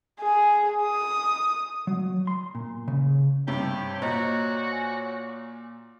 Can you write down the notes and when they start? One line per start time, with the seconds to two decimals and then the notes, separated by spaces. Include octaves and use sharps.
0.20 G#4
0.82 D#6
1.87 F#3
2.27 C6
2.55 A#2
2.88 C#3
3.48 G2 C3 G4 C#5
4.02 A#2 F#4 C5 D#5 A#5
4.72 G#5